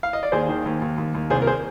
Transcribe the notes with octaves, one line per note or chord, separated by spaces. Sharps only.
F5
D#5
D5
D#2 G#4 C5
D#3
D#2
D#2
D#2
D#2
C2 G#4 C5
A#4
G#4 C5